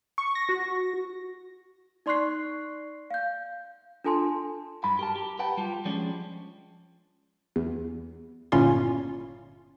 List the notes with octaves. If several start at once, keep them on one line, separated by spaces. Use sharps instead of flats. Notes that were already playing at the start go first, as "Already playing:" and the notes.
C#6
A#6
F#4
D#4 D5 C6 C#6 F#6 C7
F5 G6
D4 F4 A4 G#5 A5 C6
G2 B5
G4 A#4 A5
G4
B4 F#5 G5 A5
G3 F4 G4
F3 G#3 C#4 D4 D5
E2
G1 A#2 C#4 E4 F4 C6